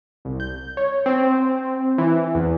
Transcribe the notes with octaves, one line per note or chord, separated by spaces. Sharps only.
C2
G6
C#5
C4
E3
E2